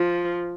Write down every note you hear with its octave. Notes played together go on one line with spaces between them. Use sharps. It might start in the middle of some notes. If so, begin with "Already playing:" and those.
Already playing: F3